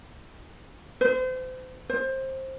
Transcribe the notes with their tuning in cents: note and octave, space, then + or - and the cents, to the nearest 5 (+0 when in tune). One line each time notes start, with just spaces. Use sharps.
C5 -35
C5 +20